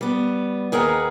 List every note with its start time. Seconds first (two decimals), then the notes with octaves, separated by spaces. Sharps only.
0.01 G3 B3
0.72 D#2 G#4 A#4 B4 F#5